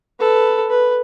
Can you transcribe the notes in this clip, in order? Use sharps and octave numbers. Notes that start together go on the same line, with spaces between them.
A4 B4
B4